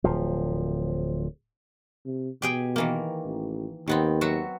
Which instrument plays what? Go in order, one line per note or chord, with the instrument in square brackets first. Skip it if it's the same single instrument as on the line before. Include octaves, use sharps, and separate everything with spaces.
[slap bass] D1 F3
[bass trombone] C3
[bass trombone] B2 [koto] G4 G#4 G5
[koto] D#3 E3 A#3
[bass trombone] A1
[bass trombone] D#2 [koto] D#3 B3 C4
[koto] F#3 F#4 E5